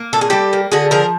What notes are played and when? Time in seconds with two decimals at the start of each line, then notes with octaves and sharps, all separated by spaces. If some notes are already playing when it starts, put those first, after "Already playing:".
Already playing: A#3
0.13 A#2 A4
0.21 G#4
0.30 G3 G4 A4
0.53 A#3
0.72 D3 F#4 G#4
0.91 F3 G#4 A#4